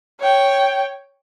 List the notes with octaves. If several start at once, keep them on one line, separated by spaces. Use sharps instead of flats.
C#5 G5